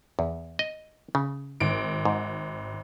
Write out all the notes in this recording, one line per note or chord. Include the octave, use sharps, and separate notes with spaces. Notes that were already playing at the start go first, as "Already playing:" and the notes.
E2
D#5
C#3
G#1 D7
G#2